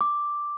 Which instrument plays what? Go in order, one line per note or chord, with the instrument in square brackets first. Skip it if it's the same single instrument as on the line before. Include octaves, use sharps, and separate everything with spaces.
[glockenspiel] D6